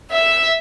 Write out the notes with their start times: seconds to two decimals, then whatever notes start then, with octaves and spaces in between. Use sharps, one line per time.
0.10 E5